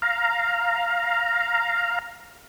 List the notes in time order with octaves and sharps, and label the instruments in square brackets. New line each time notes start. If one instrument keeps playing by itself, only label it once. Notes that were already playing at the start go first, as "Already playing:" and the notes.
[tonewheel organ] F5 A#5